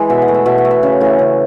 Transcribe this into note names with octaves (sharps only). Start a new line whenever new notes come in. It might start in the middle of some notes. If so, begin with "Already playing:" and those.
Already playing: E3 G#3
B2 E5
F#5
A3
E5
B2 E5
F#5
A3
E5
C#3
E3 A3
C#3